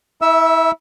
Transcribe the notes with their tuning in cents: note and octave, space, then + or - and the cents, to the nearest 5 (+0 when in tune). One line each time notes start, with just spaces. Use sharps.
E4 -35 E5 +0 E6 +0